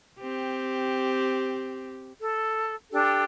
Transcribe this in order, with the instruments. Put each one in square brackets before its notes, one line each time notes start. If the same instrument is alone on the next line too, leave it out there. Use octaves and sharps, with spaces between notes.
[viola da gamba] C4 G4
[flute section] A4
D4 G4 A4